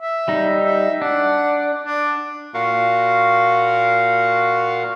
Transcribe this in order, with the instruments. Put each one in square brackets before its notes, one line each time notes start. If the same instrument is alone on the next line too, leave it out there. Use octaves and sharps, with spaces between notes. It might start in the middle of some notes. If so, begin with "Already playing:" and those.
[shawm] E5
[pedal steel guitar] G3 D#4
[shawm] E5
[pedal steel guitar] D4 [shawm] F#5
[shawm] D4
[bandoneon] A#2 F#4 A#4 F5 F#5